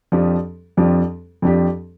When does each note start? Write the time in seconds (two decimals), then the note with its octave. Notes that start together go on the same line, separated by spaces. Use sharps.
0.12 F2 F3 D4 G4
0.77 F2 F3 D4 G4
1.42 F2 F3 D4 G4